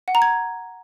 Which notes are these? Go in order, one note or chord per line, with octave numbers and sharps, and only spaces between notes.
F#5
A#5
G#6